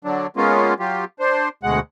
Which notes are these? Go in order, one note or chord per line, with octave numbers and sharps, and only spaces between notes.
D3 F#3 D4
G#3 A#3 B3 C#4 F4
F#3 F4 G4
D4 C5
D2 B2 G#3 F#5